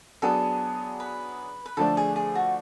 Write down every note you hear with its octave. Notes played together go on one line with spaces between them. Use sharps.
F#3 B3 D4 G#4 A4
B4
B4
D3 F3 A3 D4 A4
G#4
G#4
F#4